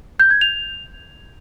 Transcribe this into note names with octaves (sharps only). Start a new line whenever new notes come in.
G6
G#6
F7